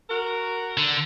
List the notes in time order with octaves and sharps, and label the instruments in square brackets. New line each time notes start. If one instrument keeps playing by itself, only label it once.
[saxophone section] F#4 A#4
[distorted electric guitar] D3